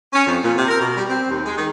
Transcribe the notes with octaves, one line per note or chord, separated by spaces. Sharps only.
C#4
F2
A#2
C3
A#4
B2
G3
C4
D#2
G#3
D#3